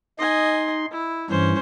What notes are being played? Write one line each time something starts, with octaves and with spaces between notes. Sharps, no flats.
D#4 D#5 G#5 C6
E4
G2 E3 C#4 C5